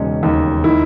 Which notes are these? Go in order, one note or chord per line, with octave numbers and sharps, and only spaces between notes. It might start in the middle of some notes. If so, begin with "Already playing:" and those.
Already playing: E1 C#3 G#3 B3 C#4 D#4
D#2
D#3 E4